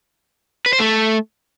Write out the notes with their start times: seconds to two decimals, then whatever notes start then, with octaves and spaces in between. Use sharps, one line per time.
0.66 B4
0.73 C5
0.80 A3